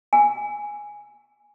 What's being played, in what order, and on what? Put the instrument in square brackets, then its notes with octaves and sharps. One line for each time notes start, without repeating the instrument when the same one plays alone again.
[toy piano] G#5